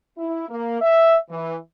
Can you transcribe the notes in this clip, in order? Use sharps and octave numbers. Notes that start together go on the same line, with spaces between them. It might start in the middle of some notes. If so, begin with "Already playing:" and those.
E4
A#3
E5
E3